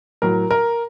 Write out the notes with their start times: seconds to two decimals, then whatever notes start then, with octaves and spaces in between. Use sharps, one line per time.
0.22 A2 F#3 A#4
0.51 A#4